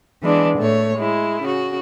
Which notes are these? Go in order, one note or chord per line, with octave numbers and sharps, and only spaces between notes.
E3 G#3 B3 D4
A2 A3 C#5
G#3 E4
C#3 F#4